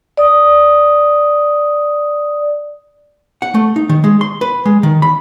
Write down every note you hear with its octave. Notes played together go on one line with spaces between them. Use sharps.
D5 D#6
F#5
A3
D#4
D#3
G#3
C6
B4
G#3
D#3
B5